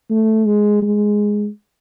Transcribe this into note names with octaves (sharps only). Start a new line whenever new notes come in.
A3
G#3
G#3